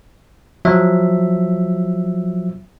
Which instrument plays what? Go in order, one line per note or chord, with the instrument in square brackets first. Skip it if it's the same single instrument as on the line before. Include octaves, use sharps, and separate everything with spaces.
[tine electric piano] F3 F#3 E5